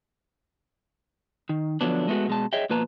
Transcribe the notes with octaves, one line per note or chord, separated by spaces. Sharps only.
D#3
D3 F3 F#3 B3 D4
G#3 A3 B3 F4 F#4
B2 G#3 A5
G#4 C#5 D#5 E5 G5
B2 F3 A#3 B4 A5 A#5